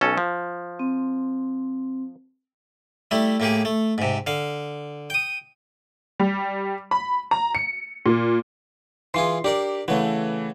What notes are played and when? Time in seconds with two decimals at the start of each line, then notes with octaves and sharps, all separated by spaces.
0.01 B1 C#4 A4
0.18 F3
0.79 C4
3.11 G3 A3 E4
3.40 A2 A#3 G4 G#4
3.65 A3
3.98 G#2 C3
4.27 D3 F5
5.10 G5 D#6
6.20 G3
6.91 B5
7.31 A#5
7.55 C#7
8.06 A#2
9.14 E3 F4 G#4 C6 C7
9.44 D4 G4 A#4 D5
9.88 C#3 E3 A3 B3